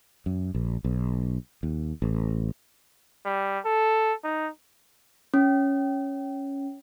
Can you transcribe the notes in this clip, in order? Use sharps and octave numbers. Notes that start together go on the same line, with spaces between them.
F#2
A#1
B1
D#2
A1
G3
A4
D#4
C#4